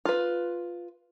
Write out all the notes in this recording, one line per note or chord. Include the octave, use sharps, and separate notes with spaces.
F4 B4